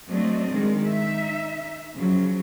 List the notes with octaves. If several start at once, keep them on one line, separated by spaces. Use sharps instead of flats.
F#3 A3 C4 D4 D#5
D#3 G#3
D#4 E5
C#3 F3 F#3